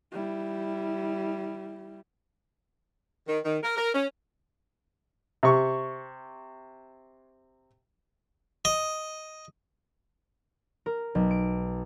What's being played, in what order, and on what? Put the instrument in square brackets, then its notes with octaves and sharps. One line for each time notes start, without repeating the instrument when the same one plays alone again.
[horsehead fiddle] G3 E4
[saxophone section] D#3
D#3
A#4
A#4
C#4
[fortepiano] C3 C#6
[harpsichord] D#5
[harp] A#4
B1
D7